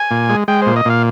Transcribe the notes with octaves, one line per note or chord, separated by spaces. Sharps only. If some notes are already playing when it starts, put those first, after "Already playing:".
Already playing: G#5
A#2
G#3
G#3 G5
A#2 C5
D#5
A#2 F5